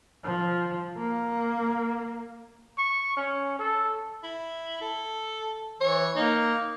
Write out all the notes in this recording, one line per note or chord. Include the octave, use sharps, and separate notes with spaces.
F3
A#3
C#6
C#4
A4
E4
A4
E3 C#5
A#3 D#4